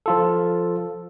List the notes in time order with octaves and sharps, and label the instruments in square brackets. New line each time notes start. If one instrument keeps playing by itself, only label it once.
[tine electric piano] F3 F4 A4